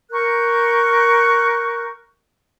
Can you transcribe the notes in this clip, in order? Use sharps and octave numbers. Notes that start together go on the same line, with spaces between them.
A#4 C#6 F#6 G6